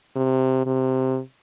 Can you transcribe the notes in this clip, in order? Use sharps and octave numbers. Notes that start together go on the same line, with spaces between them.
C3
C3